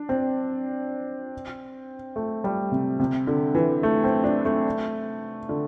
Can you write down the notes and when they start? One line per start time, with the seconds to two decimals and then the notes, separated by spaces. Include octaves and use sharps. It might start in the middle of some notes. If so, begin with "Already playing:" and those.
Already playing: D4
0.09 C4
2.16 A3
2.44 G3
2.72 C3
2.99 C3
3.27 D3
3.55 E3
3.83 A3
4.04 C4
4.24 D4
4.45 A3
5.49 D3